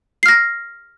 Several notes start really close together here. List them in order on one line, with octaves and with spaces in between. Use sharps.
C7 F6 A#6